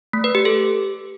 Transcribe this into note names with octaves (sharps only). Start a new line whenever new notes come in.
A3
B4
G4
A4